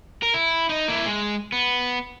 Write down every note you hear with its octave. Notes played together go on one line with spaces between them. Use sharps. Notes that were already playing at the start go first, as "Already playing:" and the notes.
A#4
E4
D#4 D#5
A#3 E4
G#3
B3